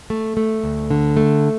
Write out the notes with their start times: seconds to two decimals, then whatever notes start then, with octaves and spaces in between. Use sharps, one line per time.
0.10 A3
0.37 A3
0.64 D2
0.90 D3
1.17 A3